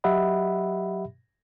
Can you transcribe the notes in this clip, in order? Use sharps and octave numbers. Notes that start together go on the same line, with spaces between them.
F#3 G4 D#5 E5 F#5 B5